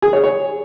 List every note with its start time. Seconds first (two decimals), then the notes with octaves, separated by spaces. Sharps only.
0.02 G#4
0.13 C#5
0.24 C#5